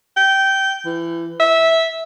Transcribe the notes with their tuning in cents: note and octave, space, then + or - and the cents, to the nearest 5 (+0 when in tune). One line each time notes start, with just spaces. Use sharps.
G5 -15
E3 +25
E5 -15